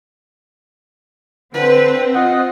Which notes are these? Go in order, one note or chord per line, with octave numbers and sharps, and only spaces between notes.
D3 C4 B4
F4 D#5 F#5